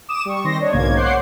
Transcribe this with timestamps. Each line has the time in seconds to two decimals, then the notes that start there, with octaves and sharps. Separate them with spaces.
0.09 D6 D#6 E7
0.25 G3 C#6
0.44 D#3 C4 C6 A#6
0.60 D4 C#5 D#5
0.73 B1 G#2 C#3 A#3 G#6
0.97 C5 C#5 F#5 D6 G6 C7